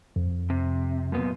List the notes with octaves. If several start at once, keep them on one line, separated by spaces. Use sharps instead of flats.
F2
C3
F#2 A#2 B3